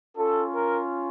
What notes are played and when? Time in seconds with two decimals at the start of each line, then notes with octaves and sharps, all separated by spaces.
0.16 C#4 F4 A4
0.53 A#4